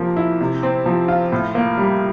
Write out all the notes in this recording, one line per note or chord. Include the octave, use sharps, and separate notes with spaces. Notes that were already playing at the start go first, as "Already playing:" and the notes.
Already playing: C3 F3 A#3
E4
C3
C4
F3
F4
A2
A#3
G3